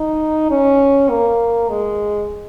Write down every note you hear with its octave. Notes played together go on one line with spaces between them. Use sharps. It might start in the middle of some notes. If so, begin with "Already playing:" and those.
Already playing: D#4
C#4
A#3
G#3